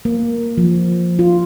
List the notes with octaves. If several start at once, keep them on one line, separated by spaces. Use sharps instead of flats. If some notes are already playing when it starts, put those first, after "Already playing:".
A#3
F3
F4